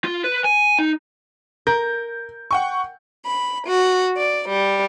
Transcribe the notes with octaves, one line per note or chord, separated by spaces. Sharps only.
F4
B4
G#5
D#4
A#4 G6
F#5 G5 C#6
B5
F#4
D5
G3